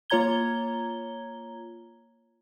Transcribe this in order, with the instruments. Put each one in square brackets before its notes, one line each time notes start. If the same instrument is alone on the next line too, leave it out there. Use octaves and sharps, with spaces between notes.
[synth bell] A#3 F4 C#5 A#5 G#6 G7